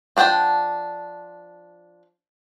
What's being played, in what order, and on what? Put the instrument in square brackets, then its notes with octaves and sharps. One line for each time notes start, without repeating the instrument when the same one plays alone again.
[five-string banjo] F3 D4 F#5 G5 A5